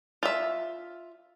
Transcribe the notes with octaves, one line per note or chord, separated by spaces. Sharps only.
F4 E5